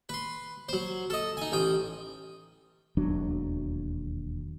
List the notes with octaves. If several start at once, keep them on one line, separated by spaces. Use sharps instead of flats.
B4 C6
F#3 C5
A4 D#5
D#4 G#5
A1 G5 D#6
E1 D#2 F#3 D4